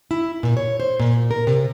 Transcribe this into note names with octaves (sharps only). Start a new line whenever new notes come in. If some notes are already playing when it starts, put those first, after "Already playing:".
E4
A#2
C#5
C5
A#2
A#4
C3